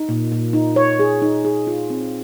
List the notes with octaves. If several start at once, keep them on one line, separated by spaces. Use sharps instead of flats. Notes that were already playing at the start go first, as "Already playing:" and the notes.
Already playing: D#4
A#2
A#2
D#4
C#5
G#4
D#4
G#4
F4
C4